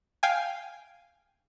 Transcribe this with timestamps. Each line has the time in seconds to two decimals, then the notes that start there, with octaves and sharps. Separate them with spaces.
0.23 F5 G5 G#5